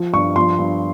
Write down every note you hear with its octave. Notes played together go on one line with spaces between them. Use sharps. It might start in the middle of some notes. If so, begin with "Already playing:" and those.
Already playing: F3
G2 C#6
F3 C6
G2